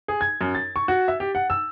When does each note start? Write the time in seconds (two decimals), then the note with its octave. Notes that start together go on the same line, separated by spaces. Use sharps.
0.08 G#4
0.21 G#6
0.41 F#2
0.55 A6
0.76 C#6
0.88 F#4
1.08 E5
1.20 G4
1.35 F#5
1.50 E6